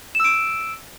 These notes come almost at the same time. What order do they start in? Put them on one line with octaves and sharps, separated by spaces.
E7 E6 D7